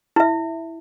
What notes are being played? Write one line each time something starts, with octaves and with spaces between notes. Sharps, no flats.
E4 E5